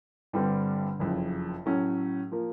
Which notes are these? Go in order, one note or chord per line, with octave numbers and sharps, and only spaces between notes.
G1 G2 D3 G3 C4
F#1 F2 C#3
A2 F#3 A3 C#4
F3 A#3